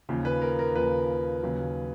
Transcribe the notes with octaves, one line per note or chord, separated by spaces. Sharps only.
D#2 C#3 F3
B4
A#4
A#4
D#2 C#3 F3 B4
D#2 C#3 F#3